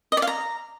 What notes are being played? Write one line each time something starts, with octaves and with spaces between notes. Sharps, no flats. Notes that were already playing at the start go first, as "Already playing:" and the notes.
D#5
D5
F5
A#5